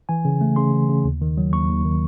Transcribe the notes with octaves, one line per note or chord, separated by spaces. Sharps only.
E3 G#5
C#3
A3
C#3 C6
E3
C#3
D#2
D#3
F#3
D#2 C#6
D#2
D#3